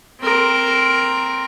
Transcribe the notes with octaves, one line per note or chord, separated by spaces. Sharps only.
C4 A#4